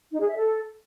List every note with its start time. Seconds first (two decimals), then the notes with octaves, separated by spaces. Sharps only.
0.12 D#4
0.20 G#4
0.28 E5
0.37 A4